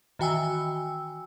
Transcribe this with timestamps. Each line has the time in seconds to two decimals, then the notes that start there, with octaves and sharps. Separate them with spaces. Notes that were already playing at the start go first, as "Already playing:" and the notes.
0.19 D#3 E3 F#4 G5 G#5 E6